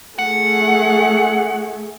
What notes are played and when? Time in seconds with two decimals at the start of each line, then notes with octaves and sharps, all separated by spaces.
0.19 A3 G#4 F#5